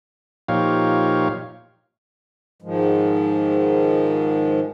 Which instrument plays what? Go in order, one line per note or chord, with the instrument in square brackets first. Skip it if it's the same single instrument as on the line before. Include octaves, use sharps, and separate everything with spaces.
[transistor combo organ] A#2 F3 D#4 G4 C#5 F5
[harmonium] G#2 D#3 F3 G#3